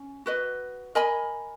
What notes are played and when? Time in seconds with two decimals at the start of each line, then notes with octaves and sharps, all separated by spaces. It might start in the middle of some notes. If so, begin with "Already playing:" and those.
Already playing: C#4
0.26 F#4 B4 D#5
0.95 A#4 D#5 G#5 B5